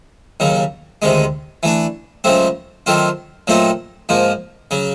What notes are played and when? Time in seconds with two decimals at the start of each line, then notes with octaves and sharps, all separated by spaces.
0.40 D#2 C#3 F#3
1.02 D2 C3 D#3 G#3
1.63 E3 A3 D4
2.24 C#2 C#3 F#3 A3 C4
2.86 D#3 F#3 A3 C4 F4
3.47 A#2 F#3 A3 C4 D#4
4.09 G#2 F3 A#3
4.71 C#3 F#3